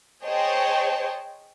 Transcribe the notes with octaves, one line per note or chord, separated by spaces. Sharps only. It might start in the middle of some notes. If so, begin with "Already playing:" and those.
G#4 C5 C#5 D#5 G5 A5